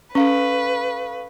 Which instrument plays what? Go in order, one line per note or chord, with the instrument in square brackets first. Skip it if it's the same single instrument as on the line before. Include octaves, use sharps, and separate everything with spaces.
[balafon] C#4 [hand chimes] A4 F5 C#6 [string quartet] B4